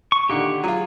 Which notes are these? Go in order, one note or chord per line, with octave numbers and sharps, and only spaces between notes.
C#6
A#2 D3 D#3 G4 F#5
F#3 F4 G#4